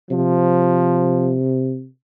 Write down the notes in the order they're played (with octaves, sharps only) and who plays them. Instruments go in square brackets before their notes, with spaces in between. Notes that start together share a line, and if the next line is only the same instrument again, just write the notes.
[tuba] C3 [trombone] F3